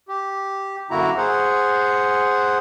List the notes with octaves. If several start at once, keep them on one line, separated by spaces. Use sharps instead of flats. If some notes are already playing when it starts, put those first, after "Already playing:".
G4
F#2 D3 A#3 E4 F#4 A#5
G#4 C5 F#5